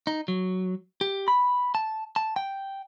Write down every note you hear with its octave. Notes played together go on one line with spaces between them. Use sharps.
D#4
F#3
G4
B5
A5
A5
G5